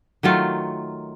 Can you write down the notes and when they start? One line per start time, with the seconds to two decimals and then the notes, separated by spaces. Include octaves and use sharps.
0.23 D#3 F#3 A3 F4